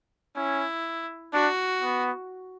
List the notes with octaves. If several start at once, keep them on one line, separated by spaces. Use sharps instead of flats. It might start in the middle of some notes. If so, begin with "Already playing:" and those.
C#4 E4
D4 F#4
B3